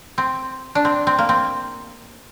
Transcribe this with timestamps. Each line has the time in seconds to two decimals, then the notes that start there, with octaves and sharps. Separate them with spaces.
0.18 C4
0.75 D4
0.85 C4
1.07 C4
1.19 A#3
1.29 C4